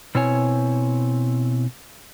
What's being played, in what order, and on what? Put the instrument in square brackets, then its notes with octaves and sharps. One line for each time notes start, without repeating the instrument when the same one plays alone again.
[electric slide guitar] B2 C4 E4 C#5 G#5